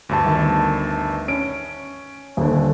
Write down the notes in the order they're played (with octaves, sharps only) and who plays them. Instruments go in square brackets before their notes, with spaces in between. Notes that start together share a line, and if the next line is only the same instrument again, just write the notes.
[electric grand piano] D2 G2 A5
[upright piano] G1 D#3
[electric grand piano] C#4 [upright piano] D7
[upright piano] D#1 D3